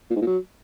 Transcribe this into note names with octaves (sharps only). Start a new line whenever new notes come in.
A#2
G#2
A#2
F#3